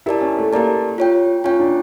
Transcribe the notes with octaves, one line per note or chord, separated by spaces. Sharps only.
E4 G4 A#4 D5 A5
C#4
A3
A#3 G4 A#4 D5 A5
F4 C#5 G5
C#4 F4 C#5 G5
D4